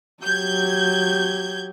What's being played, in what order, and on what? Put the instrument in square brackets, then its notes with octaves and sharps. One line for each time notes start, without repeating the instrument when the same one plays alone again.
[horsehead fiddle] F#3 G4 [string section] G6 G#6